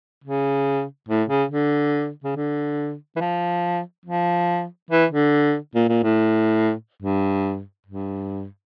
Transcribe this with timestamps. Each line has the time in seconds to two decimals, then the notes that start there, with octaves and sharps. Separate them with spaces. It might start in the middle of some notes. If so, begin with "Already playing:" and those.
0.24 C#3
1.08 A2
1.29 C#3
1.51 D3
2.24 C#3
2.36 D3
3.16 E3
3.21 F3
4.05 F3
4.90 E3
5.11 D3
5.75 A#2
5.89 A#2
6.03 A2
7.02 G2
7.87 G2